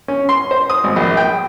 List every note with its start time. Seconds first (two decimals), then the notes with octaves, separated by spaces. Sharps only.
0.08 C#4
0.29 C6
0.51 C5
0.70 D#6
0.84 G#1
0.96 A#1
1.17 G5